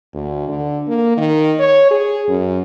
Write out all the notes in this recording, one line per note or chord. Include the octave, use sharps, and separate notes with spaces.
D2
D3
A#3
D#3
C#5
G#4
F#2